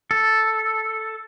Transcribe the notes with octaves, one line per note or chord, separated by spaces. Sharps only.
A4